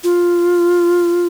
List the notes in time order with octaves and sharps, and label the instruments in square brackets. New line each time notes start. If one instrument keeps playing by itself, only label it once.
[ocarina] F4